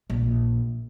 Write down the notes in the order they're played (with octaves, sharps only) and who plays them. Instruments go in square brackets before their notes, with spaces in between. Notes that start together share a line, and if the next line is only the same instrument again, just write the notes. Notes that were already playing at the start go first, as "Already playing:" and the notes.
[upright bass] A#1